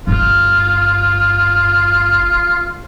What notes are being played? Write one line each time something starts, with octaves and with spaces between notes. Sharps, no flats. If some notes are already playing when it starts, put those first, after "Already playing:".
G1 F4